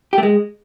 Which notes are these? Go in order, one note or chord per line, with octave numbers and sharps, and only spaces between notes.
G4
A3
G#3